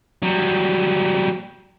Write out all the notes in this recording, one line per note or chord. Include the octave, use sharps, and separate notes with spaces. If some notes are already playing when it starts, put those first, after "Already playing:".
F#3 G3